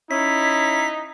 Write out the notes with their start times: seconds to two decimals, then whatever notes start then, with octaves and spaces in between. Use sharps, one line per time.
0.11 C#4 D#4 E4 B6